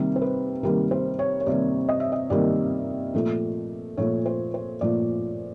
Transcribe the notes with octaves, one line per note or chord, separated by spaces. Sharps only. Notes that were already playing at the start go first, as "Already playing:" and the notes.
Already playing: C3 D#3 G3 A#3 A#4
C5
B4
C3 D#3 G3 A#3 A#4
C5
C#5
C#5
C3 D#3 G3 A#3 D5
D#5
E5
D#5
C3 D#3 G3 A#3 D5
A#2 F3 A3
A#2 F3 A3 C#5
C5
C5
A#2 F3 A3 D5